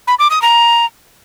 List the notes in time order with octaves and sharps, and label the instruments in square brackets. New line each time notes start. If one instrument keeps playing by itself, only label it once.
[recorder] B5
D6
D#6
A#5